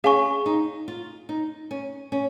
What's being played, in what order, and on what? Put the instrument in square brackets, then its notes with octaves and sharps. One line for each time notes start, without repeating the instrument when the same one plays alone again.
[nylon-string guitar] C#4 [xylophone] G#4 F5 G#5 C#6
[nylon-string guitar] D#4
F4
D#4
C#4
C#4